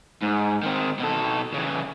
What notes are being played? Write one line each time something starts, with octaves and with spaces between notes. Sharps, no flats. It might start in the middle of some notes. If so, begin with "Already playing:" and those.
G#2
D#3 C4
B2 A4
C#3 E3